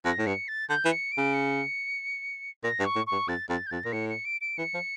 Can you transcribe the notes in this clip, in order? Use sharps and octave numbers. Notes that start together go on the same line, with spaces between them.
F2 A#6
A2
G2 C#7
A6
D3 G6
E3
C#7
D7
C#3
C#7
A#2 A#6
G2
C#6
A2
C#6
G2
F2 A6
F2 A6
G6
F2 A6
A#2 A#6
A2 C#7
C#7
D7
D7
E3 C#7
F3